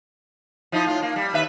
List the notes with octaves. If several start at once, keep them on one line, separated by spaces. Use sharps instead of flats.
F3 D#4 E4
A2 F4
A#3
G3
D#2 B4 E5